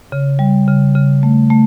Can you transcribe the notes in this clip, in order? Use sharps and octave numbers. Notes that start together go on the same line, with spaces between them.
C#3
G3
C#3
C#3
A3
A3